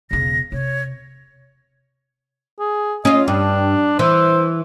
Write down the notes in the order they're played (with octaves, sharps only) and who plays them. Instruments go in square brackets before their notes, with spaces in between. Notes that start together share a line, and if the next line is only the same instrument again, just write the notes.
[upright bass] E1 C#3 [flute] A#6
[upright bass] C3 [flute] C#5
[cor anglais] G#4
[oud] C#4 F4 [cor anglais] D#5
[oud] G2 [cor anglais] D4
[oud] E3 [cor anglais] C5